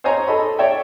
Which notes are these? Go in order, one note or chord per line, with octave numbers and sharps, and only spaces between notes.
C5 C#5 D#5 G#5 A#5
A4 D#5 B5
C#5 D5 E5 G5